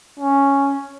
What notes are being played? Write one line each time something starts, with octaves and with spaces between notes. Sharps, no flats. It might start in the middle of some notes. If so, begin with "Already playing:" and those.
C#4